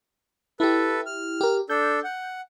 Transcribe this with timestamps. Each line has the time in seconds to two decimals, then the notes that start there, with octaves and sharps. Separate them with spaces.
0.60 E4 G4 A4 B4
1.06 F6
1.41 G4 A#4
1.70 D4 A4 G6
2.04 F#5